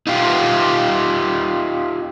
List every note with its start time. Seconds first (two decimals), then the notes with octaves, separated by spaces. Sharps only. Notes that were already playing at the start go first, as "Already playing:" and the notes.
0.07 D#4 F4 G4